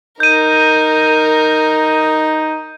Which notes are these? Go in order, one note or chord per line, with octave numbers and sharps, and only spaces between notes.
D#4 A#4 G6 D#7